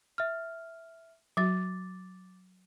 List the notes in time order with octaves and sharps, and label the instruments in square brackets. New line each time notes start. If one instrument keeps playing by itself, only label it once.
[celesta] E5 F6
[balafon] F#3 F#4 [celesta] D6 A6